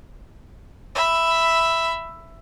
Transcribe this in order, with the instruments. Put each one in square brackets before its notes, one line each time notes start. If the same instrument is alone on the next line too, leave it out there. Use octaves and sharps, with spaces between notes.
[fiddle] E5 B5